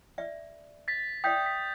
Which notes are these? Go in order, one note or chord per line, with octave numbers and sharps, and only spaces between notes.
D5 E5
A6 B6
D5 E5 G5 D#6 G6 B6
B6